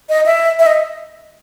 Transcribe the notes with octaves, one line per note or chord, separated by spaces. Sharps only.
D#5
E5
E5
D#5